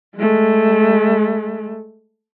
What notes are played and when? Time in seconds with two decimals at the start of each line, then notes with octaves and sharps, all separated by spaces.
0.16 G#3 A3